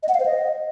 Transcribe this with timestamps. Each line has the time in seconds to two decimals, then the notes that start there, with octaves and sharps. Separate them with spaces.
0.03 D#5
0.09 F#5
0.14 F5
0.20 C5
0.26 D#5